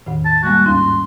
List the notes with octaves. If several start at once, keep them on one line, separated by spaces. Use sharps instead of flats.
E2 A2 D#3
A5
G3 G#3 A#3 F#4
D#2 G#2 D#4 C6